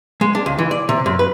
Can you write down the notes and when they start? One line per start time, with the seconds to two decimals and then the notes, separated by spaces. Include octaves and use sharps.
0.21 G#3
0.35 D4
0.46 C#2
0.59 E3
0.71 D5
0.89 C3
1.06 F#2
1.19 B4